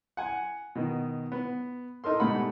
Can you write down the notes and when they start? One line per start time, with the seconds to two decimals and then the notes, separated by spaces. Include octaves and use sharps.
0.17 F#5 G#5
0.75 B2 D#3
1.32 B3
2.04 D#4 A4 A#4 C6
2.20 G#2 B2 G3 A3 F#5 B5